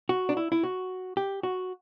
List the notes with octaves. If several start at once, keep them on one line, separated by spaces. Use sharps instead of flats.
F#4
D4
E4
E4
F#4
G4
F#4